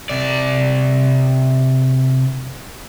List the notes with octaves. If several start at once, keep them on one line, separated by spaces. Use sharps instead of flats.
C3 D5